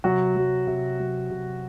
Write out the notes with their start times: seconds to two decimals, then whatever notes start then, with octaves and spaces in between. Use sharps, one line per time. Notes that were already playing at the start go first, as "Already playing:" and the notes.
0.04 C3 F#3 F#4
0.36 F#3
0.67 C3
1.00 F#3
1.31 C3